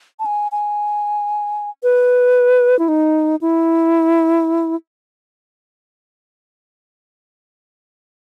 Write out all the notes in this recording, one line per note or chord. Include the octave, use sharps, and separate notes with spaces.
A5
G#5
G#5
B4
E4
D#4
E4